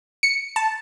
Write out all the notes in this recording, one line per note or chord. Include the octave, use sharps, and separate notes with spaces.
C#7
A5